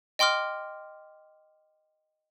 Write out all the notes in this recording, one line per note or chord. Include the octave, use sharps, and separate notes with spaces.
D#5 G5 C6 D6 F6